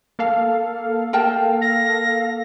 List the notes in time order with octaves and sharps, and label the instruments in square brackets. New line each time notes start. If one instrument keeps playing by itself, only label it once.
[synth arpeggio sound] A#3 A4 F5
[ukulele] A#4 G5 A5
[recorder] A#6